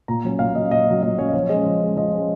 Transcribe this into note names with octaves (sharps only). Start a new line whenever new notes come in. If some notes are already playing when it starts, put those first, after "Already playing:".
A#2 A#5
F#3 C#4
A#2 F5
F#3 C#4 D#5
A#2 D#5
F#3 C#4
A#2 D#5
F#3 C#4 C#5
D#5
F3 C#5
G#3 C#4 D#5
F3
G#3 C#4
F3 D#5
G#3 C#4